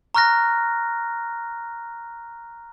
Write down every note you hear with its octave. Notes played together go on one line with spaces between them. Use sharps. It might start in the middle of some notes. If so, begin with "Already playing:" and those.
A#5 C#6 F6 F#6 A#6